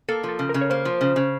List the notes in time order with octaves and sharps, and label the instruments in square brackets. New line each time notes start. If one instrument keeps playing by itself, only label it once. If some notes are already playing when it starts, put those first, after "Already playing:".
[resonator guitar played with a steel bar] A#3 [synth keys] A4
[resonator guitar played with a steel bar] F3
[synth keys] A4
[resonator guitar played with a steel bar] C#3
[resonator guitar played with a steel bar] C#3 [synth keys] A#4
[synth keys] C#5
[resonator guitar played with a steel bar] A#3 [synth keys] C5
[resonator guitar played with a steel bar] F3
C#3
C#3